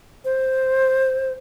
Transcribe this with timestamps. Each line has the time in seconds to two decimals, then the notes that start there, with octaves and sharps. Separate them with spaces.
0.25 C5